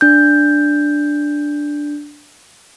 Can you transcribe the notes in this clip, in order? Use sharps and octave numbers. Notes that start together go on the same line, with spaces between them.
D4 G6